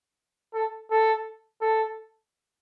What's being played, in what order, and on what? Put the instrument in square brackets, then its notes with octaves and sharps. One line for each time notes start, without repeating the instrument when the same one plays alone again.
[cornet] A4
A4
A4